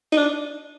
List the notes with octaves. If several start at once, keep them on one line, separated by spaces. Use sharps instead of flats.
D#4
D4